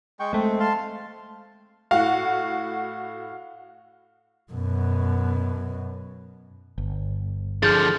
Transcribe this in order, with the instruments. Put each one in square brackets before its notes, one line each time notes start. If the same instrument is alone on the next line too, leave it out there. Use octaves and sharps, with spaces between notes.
[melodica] G#3 G5 C#6
[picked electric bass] G#3 A3 [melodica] C4
[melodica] F5 A5 C6
[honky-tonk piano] A2 F#4 F#5 [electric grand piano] F5
[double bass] F#2 B2
[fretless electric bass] G1
[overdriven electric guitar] D3 F3 [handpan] G#4 [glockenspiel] F6 G6 A6